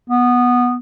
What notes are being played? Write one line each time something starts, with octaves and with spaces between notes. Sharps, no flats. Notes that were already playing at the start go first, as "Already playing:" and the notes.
B3